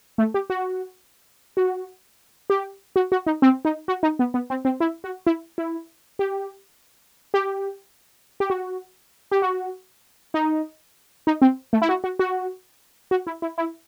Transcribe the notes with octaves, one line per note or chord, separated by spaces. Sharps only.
A3
G4
F#4
F#4
G4
F#4
F#4
D#4
C4
D#4
F#4
D#4
B3
B3
C4
C4
E4
F#4
E4
E4
G4
G4
G4
F#4
G4
F#4
D#4
D#4
C4
A3
E4
F#4
F#4
F#4
F#4
E4
E4
E4